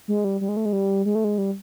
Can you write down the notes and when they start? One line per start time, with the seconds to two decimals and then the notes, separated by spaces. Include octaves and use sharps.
0.08 G#3
0.24 G3
0.41 G3
0.49 G#3
0.57 A3
0.65 G#3
0.73 G3
1.05 G#3
1.15 A3
1.24 G#3
1.38 G3